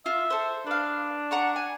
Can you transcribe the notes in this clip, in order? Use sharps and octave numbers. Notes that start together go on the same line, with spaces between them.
F4 E5
A4 C5
D4 B4 F5
F#5 A#5 C#6
G#5